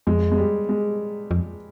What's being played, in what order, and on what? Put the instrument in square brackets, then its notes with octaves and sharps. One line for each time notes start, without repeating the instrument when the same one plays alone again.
[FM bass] F2 [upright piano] G#3
[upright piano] G#3
G3
G#3
[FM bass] F2